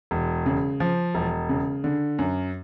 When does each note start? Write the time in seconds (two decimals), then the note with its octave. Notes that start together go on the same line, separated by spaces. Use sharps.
0.11 E1
0.46 C#3
0.80 F3
1.15 E1
1.49 C#3
1.84 D3
2.19 F#2